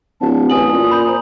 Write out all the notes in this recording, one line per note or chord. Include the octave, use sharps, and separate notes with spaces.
D1 A5
A5
A1 G#5 D#6 F#7
A#2
B5 G6
C5 A#5 D#6